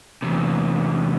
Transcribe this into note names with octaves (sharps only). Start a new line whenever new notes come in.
E2 C3